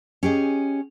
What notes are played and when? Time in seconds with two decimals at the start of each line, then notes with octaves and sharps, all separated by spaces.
0.23 C#4 G4 G#4 D#5